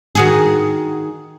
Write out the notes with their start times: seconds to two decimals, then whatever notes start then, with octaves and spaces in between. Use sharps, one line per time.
0.15 D#3 F#4 G#4